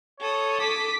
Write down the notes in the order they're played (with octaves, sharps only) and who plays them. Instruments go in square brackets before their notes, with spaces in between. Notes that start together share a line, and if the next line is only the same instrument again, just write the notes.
[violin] A4 D#6 [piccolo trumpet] C#5
[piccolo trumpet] D6 [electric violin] B6